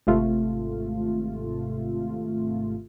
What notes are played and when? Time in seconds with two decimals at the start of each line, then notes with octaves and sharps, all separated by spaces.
0.07 G#1 C3 A3 F4